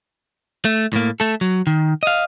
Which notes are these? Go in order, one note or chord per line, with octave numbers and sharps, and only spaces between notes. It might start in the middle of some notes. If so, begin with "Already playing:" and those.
A3
A2 A#3
A3 A4
F#3
D#3
D#5 F5